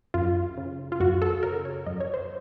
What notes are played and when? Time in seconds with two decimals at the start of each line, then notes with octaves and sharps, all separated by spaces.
0.14 F#2 F4
0.57 C#3
0.92 F4
1.00 F#2 F#4
1.22 A4
1.43 C#3 A#4
1.65 C#5
1.86 F#2 D#5
2.00 C#5
2.14 C5